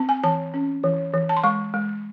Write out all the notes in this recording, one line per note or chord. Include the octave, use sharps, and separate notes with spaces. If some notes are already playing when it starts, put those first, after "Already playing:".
Already playing: C4
G#5
E3 A5
C#4
E3
E3
A5
C6
G#3 C#6
G#3